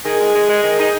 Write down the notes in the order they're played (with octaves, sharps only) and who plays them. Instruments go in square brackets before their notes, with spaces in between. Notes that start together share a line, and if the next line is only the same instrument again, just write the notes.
[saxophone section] D#3 G#4
G#3
G#3
G#3
D#3
D#4